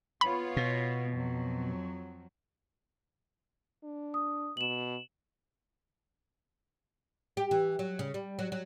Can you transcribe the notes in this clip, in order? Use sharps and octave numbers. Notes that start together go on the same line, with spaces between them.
B3 F4 C#5 B5
B2
F2 F#3
D4
D#6
B2 E7 F#7
G4
E3
F#3
C#3
G3
F#3
F#3